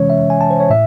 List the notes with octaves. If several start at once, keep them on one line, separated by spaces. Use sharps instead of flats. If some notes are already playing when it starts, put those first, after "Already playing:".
Already playing: C3 E3 G#3 C#4 C#5
E5
G#5
A5
C5
C#5
A2 E5